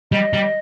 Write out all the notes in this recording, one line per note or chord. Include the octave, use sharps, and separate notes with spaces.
G3 D#5
G3